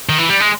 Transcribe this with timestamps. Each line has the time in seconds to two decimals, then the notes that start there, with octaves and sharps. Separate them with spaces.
0.09 D#3
0.18 E3
0.29 G3
0.40 G#3